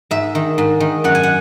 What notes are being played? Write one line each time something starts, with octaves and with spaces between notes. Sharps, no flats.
G#2 E5
D#3
G#2
D#3
F#2 F#5
G#5
F#5